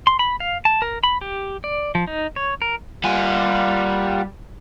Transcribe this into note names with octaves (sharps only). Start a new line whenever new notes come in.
C6
B5
F5
A5
A#4
B5
G4
D5
F3
D#4
C#5
A#4
G3 A#3 F4 F#5 G#5